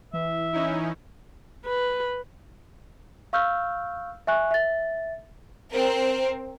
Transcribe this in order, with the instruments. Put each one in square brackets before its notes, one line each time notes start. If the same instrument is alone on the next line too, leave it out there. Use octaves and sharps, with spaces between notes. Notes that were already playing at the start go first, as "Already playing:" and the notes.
[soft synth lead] E3 [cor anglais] E5
[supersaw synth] C#4 D#4 E4
[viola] B4
[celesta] F5 C#6 E6 F6 G6
E5 G#5 C#6 F#6
E5 A6
[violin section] C4 A#4